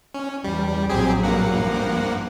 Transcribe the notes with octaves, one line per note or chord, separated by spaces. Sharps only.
C#4
E2 G3
A#1 F#3 C4 G4 G#4
G2 A#3 F#5
F3